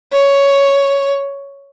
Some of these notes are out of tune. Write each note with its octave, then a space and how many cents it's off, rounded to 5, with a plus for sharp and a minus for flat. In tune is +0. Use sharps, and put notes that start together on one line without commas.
C#5 +5